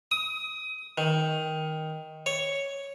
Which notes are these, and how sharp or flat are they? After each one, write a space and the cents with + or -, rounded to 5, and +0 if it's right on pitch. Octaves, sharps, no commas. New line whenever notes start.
D#6 +20
D#3 +10
C#5 +0